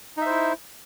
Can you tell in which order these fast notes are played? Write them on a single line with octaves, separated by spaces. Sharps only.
D#4 E5 C5 E4